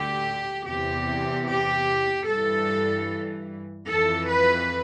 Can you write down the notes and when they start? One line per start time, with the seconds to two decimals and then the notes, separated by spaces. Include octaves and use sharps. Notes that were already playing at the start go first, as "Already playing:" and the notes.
Already playing: D2 D3 G4
0.66 E2 C3 E3 G4
1.47 G4
2.27 G2 E3 A4
3.88 F2 E3 A4
4.29 B4